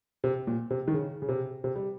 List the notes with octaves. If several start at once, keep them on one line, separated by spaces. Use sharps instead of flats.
C3
A#2
C3
D#3
C#3
C#3
C3
C3
G3